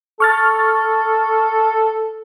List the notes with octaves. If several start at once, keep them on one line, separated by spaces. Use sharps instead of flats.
A4 C#6 F6 A6